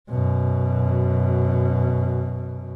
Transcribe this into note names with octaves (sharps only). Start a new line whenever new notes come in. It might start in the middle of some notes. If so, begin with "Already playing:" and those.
F#2 B2